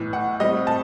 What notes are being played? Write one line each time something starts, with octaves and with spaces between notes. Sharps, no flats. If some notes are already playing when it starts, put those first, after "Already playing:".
Already playing: B1 A2 E3
F#5
A2 G3 C4 D#5
A5